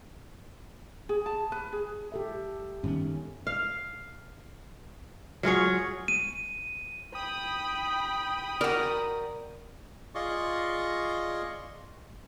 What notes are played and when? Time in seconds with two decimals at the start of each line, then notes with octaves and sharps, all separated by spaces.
1.09 G#4
1.26 A5
1.52 B4
1.73 G#4
2.12 G4 A4 E5
2.83 G2 D#3 B3 C#4
3.47 F5
5.43 F#3 F4 G#4 C#5
6.08 D#7
7.15 G5 B5 D#6
8.61 F#4 A#4 D5
10.15 F4 G#4 D5 D#5 C6 C#6